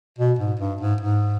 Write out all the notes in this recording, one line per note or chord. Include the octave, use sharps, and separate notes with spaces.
B2
G#2
G2
G#2
G#2